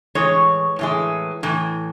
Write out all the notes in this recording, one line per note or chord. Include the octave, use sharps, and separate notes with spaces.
A2 E3 G#3 C#5
A2 E3 G#3
A2 E3